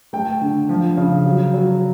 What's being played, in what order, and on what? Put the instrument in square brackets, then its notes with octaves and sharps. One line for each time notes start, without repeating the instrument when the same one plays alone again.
[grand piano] A3 G5
D3
F3
C#3
F#3
F#3